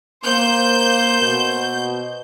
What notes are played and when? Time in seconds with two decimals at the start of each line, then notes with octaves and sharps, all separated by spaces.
0.25 A#3 C5 G6
1.22 B2